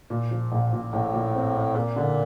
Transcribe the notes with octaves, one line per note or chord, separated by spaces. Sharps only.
A#2
F3
A#1
A#2
A#1 A2
A#2
C4
C4
A#2 A#3
D3